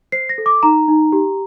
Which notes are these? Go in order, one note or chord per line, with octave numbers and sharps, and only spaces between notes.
C5 C7
A#6
A4
D6
D#4 A#5
D#4
G4